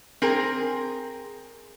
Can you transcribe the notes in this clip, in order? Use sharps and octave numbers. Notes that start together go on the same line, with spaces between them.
C4 G#4 A#4